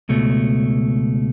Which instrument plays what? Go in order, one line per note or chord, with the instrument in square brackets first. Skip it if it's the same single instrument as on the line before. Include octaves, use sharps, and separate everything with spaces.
[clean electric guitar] C#2 B2 A3